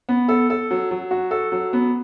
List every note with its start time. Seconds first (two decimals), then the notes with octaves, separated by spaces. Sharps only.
0.09 B3
0.28 A4
0.50 A4
0.71 F#3
0.91 F#3
1.11 F#4
1.31 A4
1.52 F#3
1.73 B3